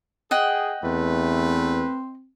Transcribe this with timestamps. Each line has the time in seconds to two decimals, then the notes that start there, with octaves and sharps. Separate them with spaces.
0.31 G#4 D#5 F#5 G5
0.84 E2 A3 C4 B4